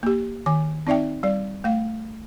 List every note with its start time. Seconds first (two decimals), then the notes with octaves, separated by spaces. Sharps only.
0.03 A#3 G4
0.46 D#3 G#5
0.87 C4 D#4 D5 E5 G5
1.23 G3 D5
1.64 A3 F5